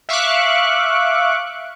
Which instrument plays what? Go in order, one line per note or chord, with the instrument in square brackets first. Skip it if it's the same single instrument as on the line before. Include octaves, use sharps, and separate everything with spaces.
[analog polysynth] E5 F5 C#6 D6 F#6